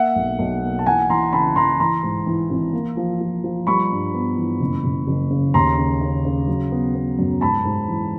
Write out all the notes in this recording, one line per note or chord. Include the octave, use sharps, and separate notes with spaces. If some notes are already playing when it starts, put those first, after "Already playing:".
Already playing: A#3 E5 F#5
B1
B1
A#3
A5
E3 F#5 G#5
E3 A#5 C6
C#3 A5 B5
E3 A#5 C6
E3 A#5 C6
G#2
E3
G#1
A#3
F3
F3
F3
G3 B5 C#6
G2
B3
E3
F#1
F#1
F#1
C#3
D#2 A#5 C6
C#3
C#3
C#3
F#3
B3
B3
F#2
G#2 A5 B5
G#2
E3